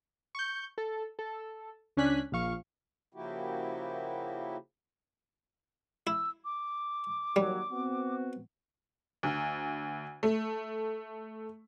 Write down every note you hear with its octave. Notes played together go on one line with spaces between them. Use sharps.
C#6 G6
A4
A4
C#2 C#4 D4 G#5 F#6 B6
A#1 F3 F5 C#6
C#3 F3 A#3 E4 F#4 G4
E4 E6
D6
D#2 F#3 G3
B3 C4 F#4
D2
A3